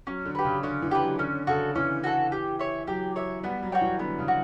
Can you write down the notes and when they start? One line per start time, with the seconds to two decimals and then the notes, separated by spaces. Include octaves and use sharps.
0.07 F#3 C#4
0.26 D3
0.35 G4 B4
0.44 C#3
0.63 D3 C#4
0.82 E3
0.91 G4 B4
1.01 F#3
1.19 D3 C#4
1.47 C#3 F#4 A4
1.75 E3 C#4
2.04 F#4 A4
2.32 G4
2.59 C#5 E5
2.87 F#3 G4
3.16 C#5 E5
3.43 G3 B3
3.63 F#3
3.72 F#4 C#5 G5
3.81 E3
3.99 D3 B3
4.18 C#3
4.28 F#4